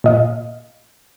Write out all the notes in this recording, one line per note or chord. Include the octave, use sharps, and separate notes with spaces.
A#2 D#5 F5